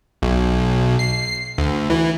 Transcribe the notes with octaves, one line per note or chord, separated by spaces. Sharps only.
B1
C7
D2
E3